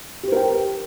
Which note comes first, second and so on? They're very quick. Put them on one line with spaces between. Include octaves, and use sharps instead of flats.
G4 C5 A#4 G5